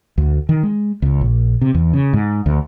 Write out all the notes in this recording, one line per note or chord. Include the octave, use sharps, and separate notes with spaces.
D2
D#3
G#3
C#2
A#1
C3
E2
C#3
G#2
D2